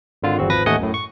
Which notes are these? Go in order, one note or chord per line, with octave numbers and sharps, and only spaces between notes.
G#1 D3 F4
G1 E2 C4 F#4
G#1 F3 B4 A#6
A1 D#2 A3 D#5 F#5 G#5
F#2 A2
C#6